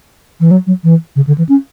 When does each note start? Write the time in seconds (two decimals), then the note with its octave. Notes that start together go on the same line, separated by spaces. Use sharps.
0.40 E3
0.51 F#3
0.67 F#3
0.84 E3
1.16 C#3
1.27 D3
1.38 E3
1.49 C#4